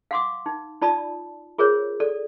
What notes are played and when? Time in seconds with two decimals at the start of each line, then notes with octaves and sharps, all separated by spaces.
0.11 F5 F#5 C6 D6 D#6
0.46 D#4
0.82 D#4 F4 D5 A5 B5 D#6
1.58 F4 G#4 A#4 C5 C#5
2.00 A4 D5